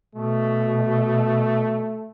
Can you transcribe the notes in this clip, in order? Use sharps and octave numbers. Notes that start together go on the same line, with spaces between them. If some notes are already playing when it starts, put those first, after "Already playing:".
B2 A3